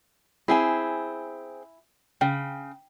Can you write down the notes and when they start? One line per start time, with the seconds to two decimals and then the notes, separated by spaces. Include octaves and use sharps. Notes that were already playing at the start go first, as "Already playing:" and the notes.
0.48 C4 E4 G#4 G#5
2.21 C#3 G5